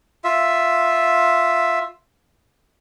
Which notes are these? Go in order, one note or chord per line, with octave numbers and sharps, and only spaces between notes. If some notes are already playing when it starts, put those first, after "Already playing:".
F4 E5